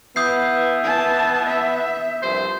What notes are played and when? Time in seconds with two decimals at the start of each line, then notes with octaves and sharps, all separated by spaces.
0.16 E3 B3 D#6 G6 C7
0.83 A5
1.46 E5
2.22 C2 G2 F3 C5